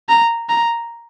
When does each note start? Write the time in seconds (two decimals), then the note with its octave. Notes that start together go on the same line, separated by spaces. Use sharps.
0.09 A#5
0.49 A#5